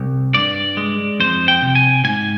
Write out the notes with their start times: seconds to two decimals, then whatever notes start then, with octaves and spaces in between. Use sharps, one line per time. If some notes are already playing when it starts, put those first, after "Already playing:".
Already playing: C2
0.34 G2 D5
0.77 G#3
1.20 F2 C5
1.48 G5
1.62 C3
1.75 G#5
2.04 G#2 G#5